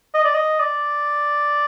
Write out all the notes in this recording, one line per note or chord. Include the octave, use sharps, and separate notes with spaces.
D#5
D5
D#5
D5